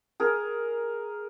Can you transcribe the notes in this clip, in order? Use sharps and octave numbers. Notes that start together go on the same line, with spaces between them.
G#4 A#4